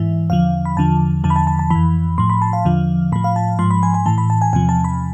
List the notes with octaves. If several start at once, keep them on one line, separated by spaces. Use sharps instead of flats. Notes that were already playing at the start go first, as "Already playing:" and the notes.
Already playing: G#2 E3 E5
E2 D3 F3 F5
B5
E2 D3 F3 A5
E2 D3 F3 A5
B5
A5
A5
A5
F2 E3 B5
A2 F3 C6
B5
A5
F5
E2 D3 F3
A2 F3 B5
F5
A5
G#2 F3 C6
B5
G#5
G#5
A2 E3 A5
B5
A5
G#5
E2 C3 F3 G#5
A5
B5